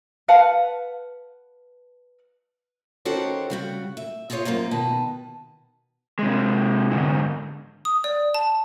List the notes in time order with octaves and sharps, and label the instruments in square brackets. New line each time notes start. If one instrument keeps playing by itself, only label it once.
[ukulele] B4 F5 F#5 A5
[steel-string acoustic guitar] D#3 C#4 F#4 G4 A4 C5
C#3 G3 F#4
E5
E4 F4 G#4 C5 C#5
F#2 C#3 A#3 F4 C5
B2 D#3 B4 A5
[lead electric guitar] C3 G#3
G#2 D3
[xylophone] D#6
D5
A5